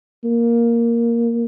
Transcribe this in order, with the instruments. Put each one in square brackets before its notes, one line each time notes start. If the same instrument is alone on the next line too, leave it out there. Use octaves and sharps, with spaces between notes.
[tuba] A#3